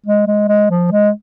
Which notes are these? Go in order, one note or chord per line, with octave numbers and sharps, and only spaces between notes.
G#3
G#3
G#3
F3
G#3